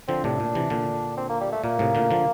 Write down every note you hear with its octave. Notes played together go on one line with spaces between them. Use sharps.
D3 F3 C4
A2 C3 D4
A#2
C3 E3
A#2 D3
C4
A#3
G3
A3
A#2 A#3
A2 C3
A#2 D3
D3 F3